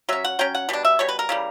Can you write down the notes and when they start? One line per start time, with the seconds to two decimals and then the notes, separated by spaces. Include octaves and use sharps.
0.09 F#3 C#4 E5
0.24 F#5
0.39 F#3 C#4 G5
0.55 F#5
0.69 B2 G3 D4
0.85 E5
0.99 B2 G3 C#5
1.09 B4
1.19 A#4
1.29 C#3 E3 G3